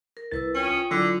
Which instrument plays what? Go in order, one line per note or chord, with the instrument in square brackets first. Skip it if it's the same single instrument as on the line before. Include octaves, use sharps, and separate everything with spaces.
[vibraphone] A#4
[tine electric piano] C2 A#4 A6 [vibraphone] E4 B4 E6
[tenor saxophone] C#4 [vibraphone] F4 G5
[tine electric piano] D#6
[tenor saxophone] D3 [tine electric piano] F#3 E4 [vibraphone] F4